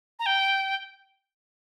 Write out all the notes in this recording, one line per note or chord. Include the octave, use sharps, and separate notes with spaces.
A#5
G5